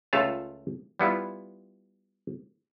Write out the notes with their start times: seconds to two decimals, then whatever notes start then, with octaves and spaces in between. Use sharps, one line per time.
0.13 C#2 A3 F4 F5 A5
0.99 G3 B3 E4 F4